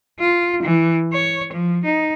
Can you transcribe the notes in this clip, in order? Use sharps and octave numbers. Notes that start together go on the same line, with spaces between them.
F4
E3
C#5
F3
D#4